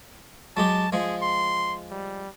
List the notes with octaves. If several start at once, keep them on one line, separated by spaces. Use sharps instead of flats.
F#3 G#3 G4 A5
F3 G#3 G#4
C6
G3